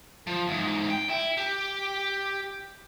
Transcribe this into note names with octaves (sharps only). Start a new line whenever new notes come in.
F3
E2 G#2
G5
E4
G4